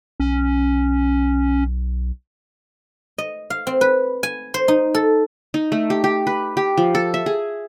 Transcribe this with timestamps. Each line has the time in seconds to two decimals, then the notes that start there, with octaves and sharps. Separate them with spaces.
0.20 B1 C#4
3.18 D#5
3.50 F5
3.67 C4
3.81 B4
4.23 G#5
4.54 C5
4.68 D#4
4.95 A4
5.54 D#4
5.72 A3
5.90 G4
6.04 G4
6.27 B4
6.57 G4
6.78 F3
6.95 A4
7.14 E5
7.26 G#4